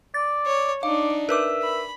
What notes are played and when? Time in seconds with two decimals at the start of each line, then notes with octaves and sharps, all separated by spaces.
0.14 D5 A6
0.46 C#5
0.83 D4 D#4 F5 D6
1.29 A#4 B4 E5 D6
1.63 B5